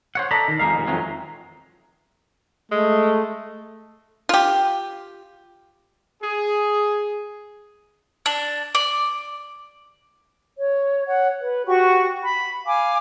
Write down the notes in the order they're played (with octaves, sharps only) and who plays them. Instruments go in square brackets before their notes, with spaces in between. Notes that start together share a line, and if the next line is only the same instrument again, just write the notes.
[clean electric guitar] C5 C#5 F#5
A4 D5 D#5 A#5 B5
D#3
F2 G#3 A#3 D#4 F5
D#2 A#2
F2 D#3 E3 F#3 G#3
[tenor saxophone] G#3 [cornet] A3
[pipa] F4 G4
[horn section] G#4
[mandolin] D4
D5
[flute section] C#5
C#5 F#5
B4
F#4 G4 F#5 C#6
B5
F5 G#5 D6